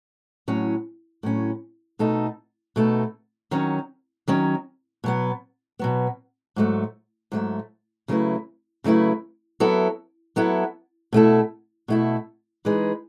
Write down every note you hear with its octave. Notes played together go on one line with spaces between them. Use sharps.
A2 F#3 C#4
A2 F#3 C#4
B2 A3 D#4 A4
B2 A3 D#4 A4
D#3 F#3 C#4
D#3 F#3 C#4
B2 F#3 B3
B2 F#3 B3
G#2 F#3 A3
G#2 F#3 A3
C#3 F#3 A3 E4 B4
C#3 F#3 A3 E4 B4
F#3 B3 E4 A4
F#3 B3 E4 A4
B2 A3 E4 A4
B2 A3 E4 A4
E3 G#3 D#4 G#4 B4